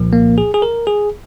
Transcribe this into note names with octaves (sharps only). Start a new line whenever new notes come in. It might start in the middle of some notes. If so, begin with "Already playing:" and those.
Already playing: C2 A#2 F3
A#3
G#4
G#4
A#4
G#4